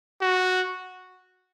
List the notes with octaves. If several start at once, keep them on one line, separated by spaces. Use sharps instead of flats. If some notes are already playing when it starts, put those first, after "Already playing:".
F#4